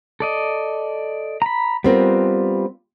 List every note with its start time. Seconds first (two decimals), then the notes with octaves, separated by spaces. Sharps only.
0.20 A4 D5 D#5
1.42 A#5 B5
1.84 G3 B3 C4 F4 A#4